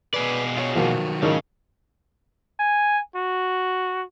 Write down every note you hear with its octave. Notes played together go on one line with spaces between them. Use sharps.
B2 G#4 B4 D5
F4 C#5
D#3 F3 F#3 A#3 F#4
G#1 C#3 A#4 D#5
G#5
F#4